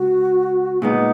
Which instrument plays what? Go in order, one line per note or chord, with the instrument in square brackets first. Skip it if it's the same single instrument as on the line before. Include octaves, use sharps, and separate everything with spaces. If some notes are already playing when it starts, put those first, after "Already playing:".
Already playing: [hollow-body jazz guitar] C#2 [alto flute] F#4
[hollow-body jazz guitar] A#2 G#3 B3 [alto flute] D#4